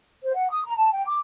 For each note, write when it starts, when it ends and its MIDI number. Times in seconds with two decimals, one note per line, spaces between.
0.23 0.34 72
0.35 0.49 78
0.50 0.62 87
0.65 0.75 82
0.77 0.91 81
0.93 1.04 79
1.07 1.17 86